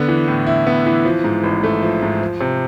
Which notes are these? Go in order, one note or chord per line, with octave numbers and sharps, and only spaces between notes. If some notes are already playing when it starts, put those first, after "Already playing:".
Already playing: D3 B3
E3
A2
E4
B3
E3
F3
G#2
A1
A3
F3
G#2
F3
C3